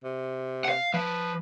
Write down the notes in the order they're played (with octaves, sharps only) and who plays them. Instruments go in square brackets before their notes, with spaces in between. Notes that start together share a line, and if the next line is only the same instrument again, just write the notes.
[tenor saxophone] C3
[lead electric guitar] F5 F#5
[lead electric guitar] F3 [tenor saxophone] B4